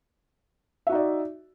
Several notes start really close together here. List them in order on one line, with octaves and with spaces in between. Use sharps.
E5 F#4 D#4 D5